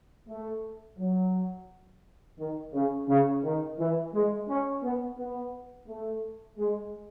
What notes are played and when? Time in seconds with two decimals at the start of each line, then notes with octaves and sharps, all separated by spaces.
0.29 A3
0.99 F#3
2.39 D#3
2.74 C#3
3.08 C#3
3.44 D#3
3.79 E3
4.14 G#3
4.49 C#4
4.83 B3
5.18 B3
5.88 A3
6.58 G#3